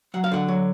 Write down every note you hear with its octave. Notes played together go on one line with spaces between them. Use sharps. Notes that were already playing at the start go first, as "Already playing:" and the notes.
F#3 F#5
F5
D3 F#5
F#3